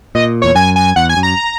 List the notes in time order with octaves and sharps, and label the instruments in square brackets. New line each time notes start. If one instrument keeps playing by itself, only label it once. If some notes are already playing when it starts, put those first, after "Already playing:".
[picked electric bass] A#2 [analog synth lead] D#5
[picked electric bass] E2 [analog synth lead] C#5
[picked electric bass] F#2 [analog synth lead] G#5
[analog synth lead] G#5
[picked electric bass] E2 [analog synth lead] F#5
[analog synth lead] G#5
[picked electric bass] F#2
[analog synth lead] A#5